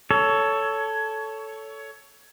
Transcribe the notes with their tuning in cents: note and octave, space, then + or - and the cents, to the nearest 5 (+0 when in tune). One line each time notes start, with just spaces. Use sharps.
A4 +0 C#5 +15